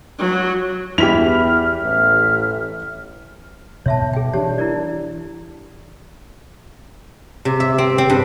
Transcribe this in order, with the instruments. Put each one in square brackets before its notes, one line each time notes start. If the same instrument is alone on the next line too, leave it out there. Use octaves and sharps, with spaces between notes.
[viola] F#3
[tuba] E2 [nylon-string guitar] E4 [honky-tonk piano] G4 B6 F7 [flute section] F6
[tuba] A1 [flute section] E5 F6
[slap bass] B2 [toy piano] C#5 E5 A5
[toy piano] G#4 G5
[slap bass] E3 C#4 D4 [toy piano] G4 C#5 A5
[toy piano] E4 A#4 D5
[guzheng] C3
E5
C4
C4
G2